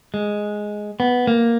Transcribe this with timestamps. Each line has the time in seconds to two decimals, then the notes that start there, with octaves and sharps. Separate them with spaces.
0.14 G#3
1.00 B3
1.27 A#3